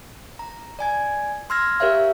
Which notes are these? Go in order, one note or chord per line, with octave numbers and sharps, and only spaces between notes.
A#5
D5 G#5 G#6
C6 E6 F6 G#6 A#6
G4 A#4 C#5 E5 F5